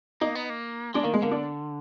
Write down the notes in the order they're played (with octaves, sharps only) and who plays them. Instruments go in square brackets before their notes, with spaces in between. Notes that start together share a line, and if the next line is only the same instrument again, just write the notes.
[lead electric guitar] A#3 [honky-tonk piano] D#4
[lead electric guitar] B3
A#3
[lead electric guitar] G#3 [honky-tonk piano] D4
[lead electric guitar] D#3 [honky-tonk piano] A#3
[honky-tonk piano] G#3
[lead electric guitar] D3 [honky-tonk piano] A#3
[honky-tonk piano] D4